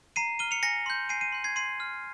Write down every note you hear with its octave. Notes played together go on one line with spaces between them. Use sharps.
A#5 C7 D#7
F6 D#7 G7
C#7 F7
G#5 A#6 C#7
C6 G6
G#5 C7 D#7
C7 D#7
C6 G6
G#6 C7
C6 C7 D#7
F6